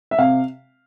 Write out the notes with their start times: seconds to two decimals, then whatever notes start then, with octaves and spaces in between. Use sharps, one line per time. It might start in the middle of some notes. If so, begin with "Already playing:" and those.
0.11 E5
0.18 C3 F5